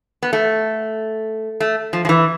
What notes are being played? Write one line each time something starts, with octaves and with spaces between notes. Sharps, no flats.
B3
A3
A3
F3
F3
E3